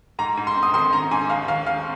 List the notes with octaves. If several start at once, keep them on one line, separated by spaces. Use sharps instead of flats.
G#2 A#5
G#2
C6
C4
D#6
D#3 C6
G#2 A#5
G#2 G#5
D#2 F5
D#2 F5
C4 F5